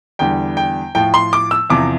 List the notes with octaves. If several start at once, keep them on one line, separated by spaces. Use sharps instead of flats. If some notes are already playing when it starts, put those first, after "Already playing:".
E2 D3 G3 G5
G5
A2 F3 G5
C6
D6
E6
E2 C3 F3 D6